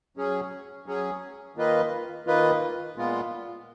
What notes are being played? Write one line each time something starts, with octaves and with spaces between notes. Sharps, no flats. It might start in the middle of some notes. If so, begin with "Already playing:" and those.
F#3 C#4 G#4
F#3 C#4 G#4
D#3 A#3 F4 B4 D#5
D#3 A#3 F4 B4 D#5
A#2 G#3 B3 F4